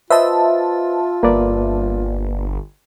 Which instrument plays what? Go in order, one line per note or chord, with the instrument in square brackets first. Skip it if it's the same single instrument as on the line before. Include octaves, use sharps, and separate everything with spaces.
[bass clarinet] F4 [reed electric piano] B4 C5 D#5 [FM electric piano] E5 A5
[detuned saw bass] G1 [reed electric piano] A#3 B4 D5